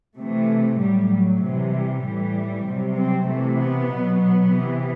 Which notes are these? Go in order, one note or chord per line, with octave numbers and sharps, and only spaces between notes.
C3 E3 A3
A2 F#3 G3
F#3
C3 E3
G3
A2 E3
C3 F#3
C4
C3 E3 A3
B3
B2 F#3
B3
C3
E3